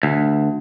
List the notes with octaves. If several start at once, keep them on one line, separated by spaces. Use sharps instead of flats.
D2